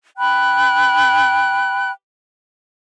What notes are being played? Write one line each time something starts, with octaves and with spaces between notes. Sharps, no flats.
G5 B5 F#6